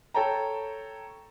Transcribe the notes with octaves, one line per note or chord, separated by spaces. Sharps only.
A4 C#5 G5 A5 A#5